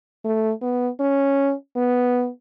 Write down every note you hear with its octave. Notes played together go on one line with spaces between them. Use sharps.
A3
B3
C#4
B3